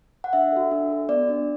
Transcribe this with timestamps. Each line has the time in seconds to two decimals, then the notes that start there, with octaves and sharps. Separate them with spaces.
0.24 F#5
0.33 D4 E5
0.52 F#4 A4
0.71 D4
0.90 F#4 A4
1.09 B3 D5
1.28 D4 F#4